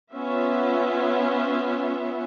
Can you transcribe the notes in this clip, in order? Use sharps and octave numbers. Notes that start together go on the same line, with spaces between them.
B3 C#4 F4 E5